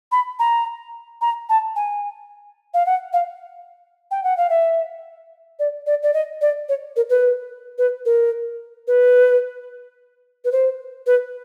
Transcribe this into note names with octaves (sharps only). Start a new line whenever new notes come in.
B5
A#5
A#5
A5
G#5
F5
F#5
F5
G5
F#5
F5
E5
D5
D5
D5
D#5
D5
C#5
A#4
B4
B4
A#4
B4
B4
C5
B4